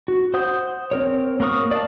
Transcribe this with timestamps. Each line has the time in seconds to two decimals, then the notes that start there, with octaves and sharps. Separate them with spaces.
0.08 F#4
0.34 C5 F#5 D#6 G6
0.91 C4 A#4 C#5
1.40 A#3 F#4 A#4 C#6 D#6
1.71 D5 F5 A5